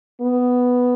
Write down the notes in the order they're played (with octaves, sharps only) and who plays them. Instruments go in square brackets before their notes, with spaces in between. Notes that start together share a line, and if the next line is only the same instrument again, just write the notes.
[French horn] B3